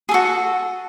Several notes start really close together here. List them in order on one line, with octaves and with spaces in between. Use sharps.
G#4 A4 F#4